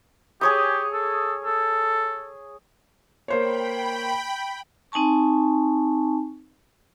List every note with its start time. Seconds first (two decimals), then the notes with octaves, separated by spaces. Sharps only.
0.41 G4 G#4 C#5 D#6
0.93 A4
1.44 A4
3.28 A#3 C5 C#5 G5 B5
4.92 C4 D#4 G#5 A5 C#6